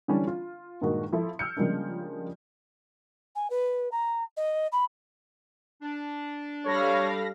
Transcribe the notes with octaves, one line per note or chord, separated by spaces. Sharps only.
D3 E3 G3 C#4 D4
F4
G2 A#2 D#3 G#3 A#3 F#4
F3 E4 A4
E6 F6 G6 C#7
C#3 F3 G3 G#3 A#3 D4
G#5
B4
A#5
D#5
B5
D4
G3 A4 C#5 F5 B5 A#6